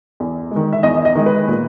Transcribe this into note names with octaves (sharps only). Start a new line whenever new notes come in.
E2
D#3 G#3
E5
E2 D#5
D#5
D#3 G#3
B4
A#2